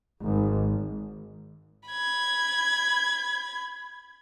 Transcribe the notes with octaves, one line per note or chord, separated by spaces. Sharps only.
G#1
B5 G#6